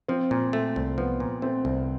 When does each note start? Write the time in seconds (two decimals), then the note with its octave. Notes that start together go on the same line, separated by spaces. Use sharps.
0.08 F3 C4
0.31 A#2
0.53 A3
0.76 C2
0.98 F3 B3
1.20 A#2
1.42 A3 C4
1.65 C2